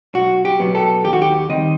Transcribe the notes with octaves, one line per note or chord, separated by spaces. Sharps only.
B1 F#4
G4
B2 F#3 B3
A4
D#2 G4
F#4
G4
D#3 G3 C4 D#5